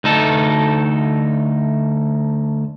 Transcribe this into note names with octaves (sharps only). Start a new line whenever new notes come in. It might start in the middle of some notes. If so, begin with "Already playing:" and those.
D2 D#4 A4